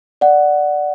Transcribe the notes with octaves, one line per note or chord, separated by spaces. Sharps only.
D5 F#5